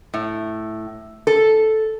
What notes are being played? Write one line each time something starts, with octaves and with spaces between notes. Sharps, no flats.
A2
A4